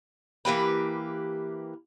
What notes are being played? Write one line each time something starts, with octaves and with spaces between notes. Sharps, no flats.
E3 A#3 G4 B4